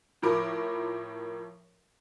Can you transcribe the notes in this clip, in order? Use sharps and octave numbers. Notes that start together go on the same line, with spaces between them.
A2 F3 A#4 B5 D6